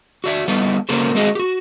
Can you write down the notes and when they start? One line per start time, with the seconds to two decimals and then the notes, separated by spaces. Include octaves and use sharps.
0.24 F#4 D5 E5
0.48 G3 B3 D#4 E4 A4 B4
0.89 C#3 F#3 A#3 A4 A#4 C5
1.15 G#3 A3 C4 F#4 G#4 D#5
1.35 F#4 G4